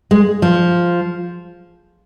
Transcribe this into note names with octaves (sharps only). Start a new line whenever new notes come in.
G#3
F3